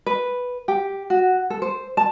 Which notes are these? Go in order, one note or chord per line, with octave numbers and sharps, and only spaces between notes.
B4
G4
F#4
A4
C5
A5